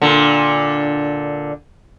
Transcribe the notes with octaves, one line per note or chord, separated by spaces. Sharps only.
A#2 D3